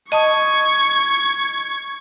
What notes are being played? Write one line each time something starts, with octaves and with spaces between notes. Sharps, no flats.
D#5 A5 C#6 D#6 G#6